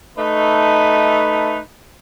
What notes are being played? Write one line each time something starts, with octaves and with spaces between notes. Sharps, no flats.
A3 D#4 B4